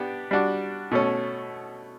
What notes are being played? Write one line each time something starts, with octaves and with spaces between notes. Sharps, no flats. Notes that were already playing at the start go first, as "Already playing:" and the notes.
Already playing: B3 D4 G4
G3 D4 F#4
B2 A3 C#4